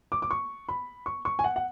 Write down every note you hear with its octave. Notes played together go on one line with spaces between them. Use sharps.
D6
D6
C#6
B5
C#6
C#6
G#5
F#5
F#5